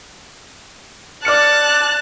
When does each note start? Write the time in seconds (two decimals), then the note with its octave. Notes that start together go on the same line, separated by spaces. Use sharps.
1.25 D5 A5 F6 F#6 C#7